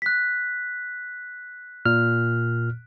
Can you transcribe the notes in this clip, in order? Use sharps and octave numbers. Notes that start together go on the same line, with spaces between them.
F#6 B6
A#2 F6